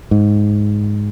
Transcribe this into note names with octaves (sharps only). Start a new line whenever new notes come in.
G#2